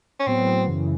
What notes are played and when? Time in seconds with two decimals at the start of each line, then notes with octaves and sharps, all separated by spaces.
0.20 C#4
0.26 A2 F#3 B3 C4
0.67 F#2 C#3 E3